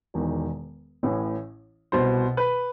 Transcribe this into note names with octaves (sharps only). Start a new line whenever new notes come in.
E1 E2 D#3
A1 A2 E3
C2 B2 C5
B4